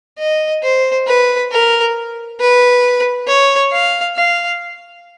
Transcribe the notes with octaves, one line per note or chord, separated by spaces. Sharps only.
D#5
C5
B4
A#4
B4
C#5
F5
F5